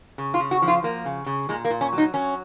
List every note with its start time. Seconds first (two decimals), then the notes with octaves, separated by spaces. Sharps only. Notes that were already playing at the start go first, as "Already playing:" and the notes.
0.18 C#3
0.34 F4
0.40 C#3
0.51 F#4
0.62 F3
0.68 F4
0.83 F3 A#3
1.05 C#3
1.26 C#3
1.49 A#2 G#3
1.65 A#3
1.70 A#2
1.81 C#4
1.92 F#3
1.98 D#4
2.14 F#3 C#4